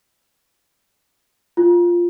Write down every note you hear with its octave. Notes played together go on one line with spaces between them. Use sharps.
F4